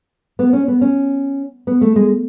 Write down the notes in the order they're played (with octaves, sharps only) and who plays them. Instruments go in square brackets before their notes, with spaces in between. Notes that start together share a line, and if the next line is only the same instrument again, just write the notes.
[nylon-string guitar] B3
C#4
B3
C#4
B3
A3
G#3